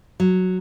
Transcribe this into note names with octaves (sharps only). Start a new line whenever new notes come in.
F#3